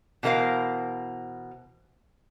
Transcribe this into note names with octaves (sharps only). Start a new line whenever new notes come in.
B2 E3 A#4 C5 F5